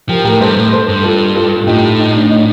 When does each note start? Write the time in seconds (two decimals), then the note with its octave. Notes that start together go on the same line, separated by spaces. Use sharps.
0.09 F3 G4 A#4
0.25 A2 G4 A#4
0.41 G2 A4 C5
0.56 A2
0.72 A4 C5
0.88 G2
1.03 F4 A4
1.35 F4 A4
1.63 F4
1.67 A2 D#4 G4
1.99 D#4
2.15 D4
2.30 D#4